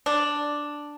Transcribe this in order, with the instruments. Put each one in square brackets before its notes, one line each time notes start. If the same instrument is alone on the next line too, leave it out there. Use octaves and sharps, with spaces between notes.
[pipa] D4